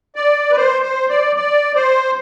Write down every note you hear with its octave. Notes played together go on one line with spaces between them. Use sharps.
D5
B4
C5
C5
D5
D5
C5